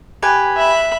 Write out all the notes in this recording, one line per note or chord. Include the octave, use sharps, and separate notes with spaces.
G4 B4 G#5
E5 B5